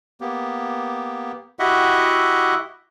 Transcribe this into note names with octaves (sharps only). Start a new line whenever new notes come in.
A#3 B3 G4
E4 F#4 G4 D#5 E5 F#5